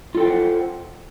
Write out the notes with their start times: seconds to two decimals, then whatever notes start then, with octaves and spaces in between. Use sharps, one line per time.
0.15 F4
0.17 A4
0.20 G5
0.23 C5
0.26 F#5